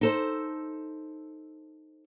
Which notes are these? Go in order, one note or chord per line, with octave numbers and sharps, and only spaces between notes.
D#4 A4 C5